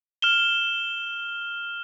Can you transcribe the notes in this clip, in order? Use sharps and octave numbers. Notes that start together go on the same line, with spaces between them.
F6 E7 G7